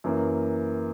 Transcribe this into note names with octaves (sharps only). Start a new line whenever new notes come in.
F#2 E3 A#3